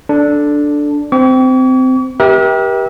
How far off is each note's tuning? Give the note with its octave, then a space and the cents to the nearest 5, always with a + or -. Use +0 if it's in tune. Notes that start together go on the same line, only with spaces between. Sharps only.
D4 +0 A4 -5
C4 -20 C#6 +45
G4 +0 A#4 +45 E5 -30